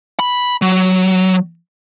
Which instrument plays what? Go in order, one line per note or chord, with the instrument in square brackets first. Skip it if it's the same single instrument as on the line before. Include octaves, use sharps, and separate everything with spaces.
[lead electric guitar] B5
F#3